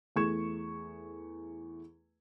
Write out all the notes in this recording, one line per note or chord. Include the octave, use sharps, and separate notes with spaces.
E2 A3 G#4 C#6 G#6 E7